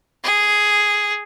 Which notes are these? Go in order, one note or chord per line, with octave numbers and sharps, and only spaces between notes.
G#4